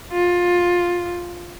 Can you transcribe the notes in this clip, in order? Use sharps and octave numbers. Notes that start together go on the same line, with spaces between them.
F4